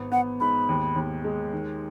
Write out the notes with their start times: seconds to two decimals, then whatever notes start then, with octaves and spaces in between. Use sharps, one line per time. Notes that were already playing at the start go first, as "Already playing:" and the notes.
Already playing: G#1 B3
0.12 B3 F#5
0.40 G#2 B5
0.69 D#2
0.96 D#2
1.24 G#3
1.53 D#3